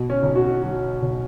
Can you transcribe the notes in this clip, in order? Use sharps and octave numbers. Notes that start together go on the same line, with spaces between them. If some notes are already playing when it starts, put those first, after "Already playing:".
Already playing: B2
C#4
B1
F#4
F#3
B1